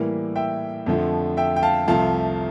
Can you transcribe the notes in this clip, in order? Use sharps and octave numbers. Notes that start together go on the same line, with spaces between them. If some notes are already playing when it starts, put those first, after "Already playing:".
Already playing: A2 E3 G3 A#3
E5 G5
F2 D3 F3 A3
E5 G5
G5
F5 A5
C2 C3 F3 A3 F5 A5